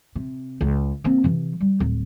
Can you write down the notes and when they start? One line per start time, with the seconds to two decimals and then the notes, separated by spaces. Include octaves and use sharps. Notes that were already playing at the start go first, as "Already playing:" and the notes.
0.15 C3
0.61 C#2
1.04 A#3 C4
1.24 C3 E3
1.60 G3
1.80 D1